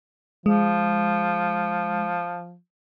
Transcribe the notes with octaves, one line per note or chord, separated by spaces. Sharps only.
F3 G#3